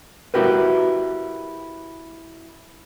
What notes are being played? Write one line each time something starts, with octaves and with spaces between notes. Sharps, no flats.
E4 F#4 G4 A#4 B4